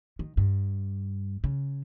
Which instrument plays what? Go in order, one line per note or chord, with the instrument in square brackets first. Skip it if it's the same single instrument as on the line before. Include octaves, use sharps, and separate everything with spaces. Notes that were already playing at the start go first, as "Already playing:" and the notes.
[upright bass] D#3
G2
C#3